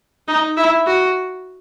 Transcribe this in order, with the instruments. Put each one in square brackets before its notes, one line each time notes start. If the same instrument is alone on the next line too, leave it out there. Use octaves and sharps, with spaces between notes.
[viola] D#4
E4
F#4